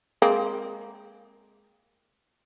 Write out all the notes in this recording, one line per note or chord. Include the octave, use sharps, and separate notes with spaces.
G#3 A#3 C4